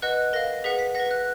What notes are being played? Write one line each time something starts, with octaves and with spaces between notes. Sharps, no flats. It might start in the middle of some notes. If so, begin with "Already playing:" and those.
B4 D#5 F#5 F#6
A#4 F5 A#6
G#4 B4 F#5 B6
B6
B4 F#5 A#6
F#6